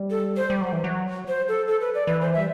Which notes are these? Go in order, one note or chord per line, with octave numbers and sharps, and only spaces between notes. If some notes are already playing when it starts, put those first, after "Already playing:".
Already playing: G3
A4
C5
G3
F#3
E3
F#3
C5
A4
A4
B4
D5
E3 B4
C5
G3 E5